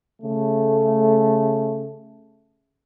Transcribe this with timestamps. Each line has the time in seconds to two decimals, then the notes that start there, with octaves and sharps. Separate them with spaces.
0.22 C#3 A3